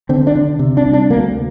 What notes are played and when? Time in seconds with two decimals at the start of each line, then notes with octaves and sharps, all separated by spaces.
0.09 D3 C4
0.27 D4
0.35 D3
0.59 C3
0.77 D4
0.85 C2
0.93 D4
1.10 D2 A#3